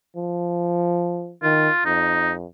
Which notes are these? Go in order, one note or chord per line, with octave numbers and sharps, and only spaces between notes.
F3
D#3 F4
F2 D#4